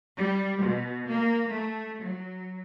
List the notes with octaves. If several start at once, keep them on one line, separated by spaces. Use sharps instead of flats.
G3
B2
A#3
A3
F#3